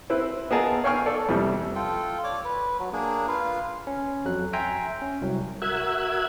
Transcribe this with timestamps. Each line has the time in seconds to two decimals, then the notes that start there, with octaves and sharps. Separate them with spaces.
0.10 C4 E4 B4
0.51 B3 F4 G#4 A#4 D#5 A5
0.84 C#5 F5 G5 G#5 C#6 F6
1.06 A4 D5
1.29 F2 C3 E3 G3
1.75 F4 A4 G5
2.24 C#5 D5 D6
2.45 B4
2.79 F#3
2.93 A#3 D4 G#4
3.28 F4 B4 F5
3.87 C#4
4.25 F2 F#3 F#6
4.53 E5 G5 G#5 A#5 C6
5.02 C#4
5.21 C2 F#3
5.62 F#4 A#4 E5 E6 F#6 G#6